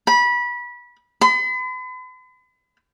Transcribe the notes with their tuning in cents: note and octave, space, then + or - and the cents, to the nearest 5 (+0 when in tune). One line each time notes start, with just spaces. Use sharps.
B5 -25
B5 +45